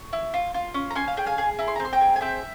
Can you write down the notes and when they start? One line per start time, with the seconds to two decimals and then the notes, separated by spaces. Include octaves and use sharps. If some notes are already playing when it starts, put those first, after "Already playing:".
Already playing: C#6
0.13 E4
0.34 F4
0.54 F4
0.74 C#4
0.91 A#5
0.95 C#4 G#5 C6
1.08 F5
1.17 G#4 G5
1.26 F5 G#5
1.38 G#4
1.59 E4 A#5
1.68 C6
1.76 A#5
1.80 C4
1.85 C6
1.93 G5 A#5
2.01 G#4
2.16 G#5
2.21 C4 E5 G5